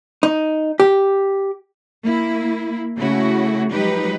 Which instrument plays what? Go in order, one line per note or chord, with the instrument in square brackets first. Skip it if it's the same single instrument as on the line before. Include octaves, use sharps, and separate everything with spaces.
[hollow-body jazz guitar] D#4
G4
[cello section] A#3 E4
C#3 A3 C#4 E4 F#4
F3 F#3 G#3 D#4 G4 B4